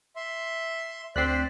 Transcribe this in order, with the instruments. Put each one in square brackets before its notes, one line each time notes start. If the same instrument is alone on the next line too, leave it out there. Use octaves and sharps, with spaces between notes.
[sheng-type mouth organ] E5 C6
[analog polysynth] D2 C4 [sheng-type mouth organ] C5 D5 [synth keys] F#6 B6 C7